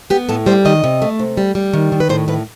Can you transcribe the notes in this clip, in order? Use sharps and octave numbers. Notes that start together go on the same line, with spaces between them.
B3 G4
A2 A4
G3 C5
D#3 D#5
C3
A3
C3
G3
G3
D#3
D#3
B4
A2 C5
A2 B4